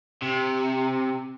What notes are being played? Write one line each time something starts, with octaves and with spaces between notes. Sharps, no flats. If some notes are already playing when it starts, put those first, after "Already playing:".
C3